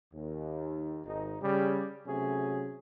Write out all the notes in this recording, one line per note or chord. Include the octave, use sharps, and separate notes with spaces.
D#2
G#1 D#4
C#3 G3
C3 F#3 A3 C#4 G#4